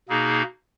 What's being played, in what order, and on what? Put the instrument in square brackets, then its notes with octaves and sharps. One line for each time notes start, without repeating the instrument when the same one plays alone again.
[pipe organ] B2 A#3 D#4 G#4